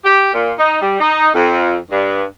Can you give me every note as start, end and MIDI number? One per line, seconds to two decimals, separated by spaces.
0.04 0.30 67
0.33 0.52 46
0.58 0.80 63
0.81 0.98 55
1.00 1.29 63
1.34 1.75 41
1.91 2.23 43